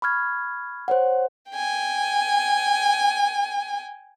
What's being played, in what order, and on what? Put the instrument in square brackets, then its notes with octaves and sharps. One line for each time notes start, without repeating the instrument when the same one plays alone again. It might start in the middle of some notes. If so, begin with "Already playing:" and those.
[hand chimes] B5 C#6 F6 G#6
C5 C#5 F#5
[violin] G5 G#5